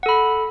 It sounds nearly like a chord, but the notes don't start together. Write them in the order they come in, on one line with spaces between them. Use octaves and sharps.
F#5 A4 B5